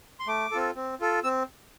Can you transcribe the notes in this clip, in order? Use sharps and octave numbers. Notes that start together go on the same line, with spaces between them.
C6
A3 D6
C4 F4 A4
C4
F4 A4
C4 E6